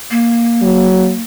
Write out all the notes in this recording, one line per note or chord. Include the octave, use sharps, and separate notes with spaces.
A#3
F#3